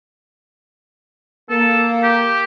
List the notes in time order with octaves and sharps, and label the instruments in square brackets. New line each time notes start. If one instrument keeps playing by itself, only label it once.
[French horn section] A#3 [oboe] A4
[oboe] G4